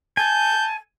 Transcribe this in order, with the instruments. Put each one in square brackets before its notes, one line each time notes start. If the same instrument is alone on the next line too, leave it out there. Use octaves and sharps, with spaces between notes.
[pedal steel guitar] G#5 [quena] A5 [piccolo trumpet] G6